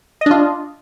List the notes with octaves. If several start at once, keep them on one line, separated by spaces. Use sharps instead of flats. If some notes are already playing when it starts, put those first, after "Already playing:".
D4 F4 D#5